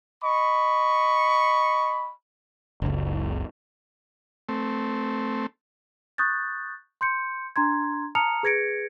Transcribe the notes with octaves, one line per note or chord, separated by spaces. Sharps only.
D#5 B5 C#6
F#1 C#2
A3 C4
C#6 D#6 F#6 G6 A6
C6 G6 C#7
D4 A#5 C6 G#6
A5 A#5 D#6 F6 C#7 F7
G#4 B4 G#6 A#6 C#7 D7